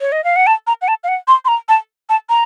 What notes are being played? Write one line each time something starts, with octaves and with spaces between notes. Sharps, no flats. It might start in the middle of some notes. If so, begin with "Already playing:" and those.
C#5
D#5
F5
F#5
A5
A#5
F#5
A5
F5
F#5
C6
C6
A#5
A5
A5
A#5